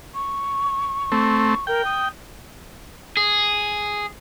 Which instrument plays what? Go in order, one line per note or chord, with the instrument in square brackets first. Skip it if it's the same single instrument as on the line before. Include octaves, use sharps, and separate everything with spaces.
[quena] C#6
[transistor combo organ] A3 C4
[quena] A#4 [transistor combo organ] G5
[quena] D#6
[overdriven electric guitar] G#4